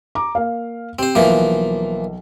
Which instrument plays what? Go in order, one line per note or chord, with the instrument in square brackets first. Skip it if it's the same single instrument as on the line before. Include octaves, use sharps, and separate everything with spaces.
[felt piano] A#5 D6
A#3 F5
[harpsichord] C4 C5 [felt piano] G4
[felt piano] B1 [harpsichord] E3 F3 A#3